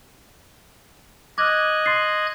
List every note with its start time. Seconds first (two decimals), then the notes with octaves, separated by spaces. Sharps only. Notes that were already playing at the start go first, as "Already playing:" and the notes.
1.38 D#5 D6 F6 F#6 G#6
1.86 C6 A6 C7